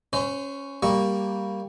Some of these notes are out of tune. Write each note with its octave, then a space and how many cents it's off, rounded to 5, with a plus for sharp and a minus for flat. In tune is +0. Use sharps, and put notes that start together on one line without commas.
C#4 +0 C5 -35
G3 +0 A#3 +0 C#6 +5